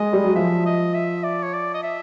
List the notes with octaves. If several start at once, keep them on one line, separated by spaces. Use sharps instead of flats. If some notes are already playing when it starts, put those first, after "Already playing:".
Already playing: G#3 D#5
G3
F#3
F3 E5
D#5
E5
D5
C#5
D5
D#5
E5